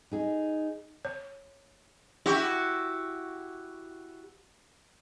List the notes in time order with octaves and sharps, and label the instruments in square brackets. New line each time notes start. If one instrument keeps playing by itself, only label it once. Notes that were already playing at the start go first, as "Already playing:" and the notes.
[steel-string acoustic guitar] D#4 G#4
[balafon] C#5
[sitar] E4 F#4 G4